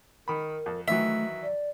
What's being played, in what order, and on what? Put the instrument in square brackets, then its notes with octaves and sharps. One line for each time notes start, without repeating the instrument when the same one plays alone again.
[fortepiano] D#3 B5 [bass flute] A#4
[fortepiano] F2
[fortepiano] D#3 E3 F#3 [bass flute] A3 [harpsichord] E5
[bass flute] D5